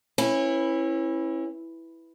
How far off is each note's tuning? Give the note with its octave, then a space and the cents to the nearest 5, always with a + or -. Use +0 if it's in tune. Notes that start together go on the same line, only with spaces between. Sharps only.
C#4 -30 E4 +0 B4 +0